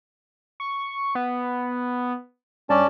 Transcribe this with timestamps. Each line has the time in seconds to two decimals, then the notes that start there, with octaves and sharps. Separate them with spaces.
0.60 C#6
1.15 B3
2.70 G2 C#4 D5 A5